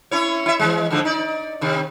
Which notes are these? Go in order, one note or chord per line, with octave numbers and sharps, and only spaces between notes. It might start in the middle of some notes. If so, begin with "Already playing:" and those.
C#4 E4 C#5
E4 E5
E3 G3 G#3
G#2 D3 F3
D#4 D5
C3 D#3